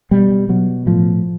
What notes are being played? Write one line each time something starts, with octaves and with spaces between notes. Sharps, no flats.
B2 G3
B2 F#3
A2 F3